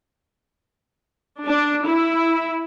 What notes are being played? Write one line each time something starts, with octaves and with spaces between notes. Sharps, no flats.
D4
E4